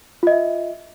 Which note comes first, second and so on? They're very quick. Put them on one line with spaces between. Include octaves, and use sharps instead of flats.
F4 D#5 E5